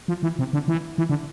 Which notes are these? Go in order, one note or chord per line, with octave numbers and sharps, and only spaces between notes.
F3
E3
C3
D3
E3
E3
D3